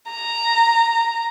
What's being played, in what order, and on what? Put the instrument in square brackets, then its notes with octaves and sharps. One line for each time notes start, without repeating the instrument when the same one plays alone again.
[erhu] A#5